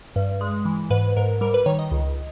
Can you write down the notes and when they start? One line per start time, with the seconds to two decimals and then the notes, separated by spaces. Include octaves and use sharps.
0.16 G2
0.41 G#3
0.65 E3
0.90 G#2 B4
1.17 G#2 A#4
1.41 G3 A#4
1.54 B4
1.66 D#3 C#5
1.79 D#5
1.91 C#2